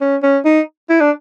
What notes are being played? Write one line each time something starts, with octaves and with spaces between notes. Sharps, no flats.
C#4
C#4
D#4
E4
D4